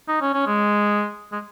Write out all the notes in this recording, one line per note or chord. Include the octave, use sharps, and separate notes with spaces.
D#4
C#4
C#4
G#3
G#3